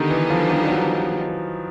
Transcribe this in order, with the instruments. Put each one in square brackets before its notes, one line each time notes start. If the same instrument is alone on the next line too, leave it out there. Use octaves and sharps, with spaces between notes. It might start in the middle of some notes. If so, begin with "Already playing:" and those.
Already playing: [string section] D3 G3 B3 D#4 [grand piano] D#3
[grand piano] E3
F3
F3
F#3